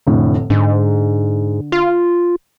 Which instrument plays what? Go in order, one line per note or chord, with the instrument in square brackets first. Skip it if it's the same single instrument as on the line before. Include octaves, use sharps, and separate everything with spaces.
[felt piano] F1 A2 D3
[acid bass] G#2 [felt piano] D3
[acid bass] F4